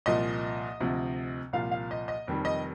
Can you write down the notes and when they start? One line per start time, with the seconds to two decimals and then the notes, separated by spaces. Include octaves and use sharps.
0.06 C2 A#2 F3 D#5
0.80 D2 C3 F3
1.53 C2 A#2 F3 F5
1.71 F5
1.91 D#5
2.08 D#5
2.27 F1 F2 D#3 G3
2.45 D#5